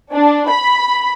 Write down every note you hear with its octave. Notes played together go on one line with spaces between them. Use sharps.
D4
B5